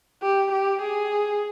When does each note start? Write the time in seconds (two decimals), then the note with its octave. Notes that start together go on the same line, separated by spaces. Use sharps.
0.22 G4
0.52 G4
0.81 G#4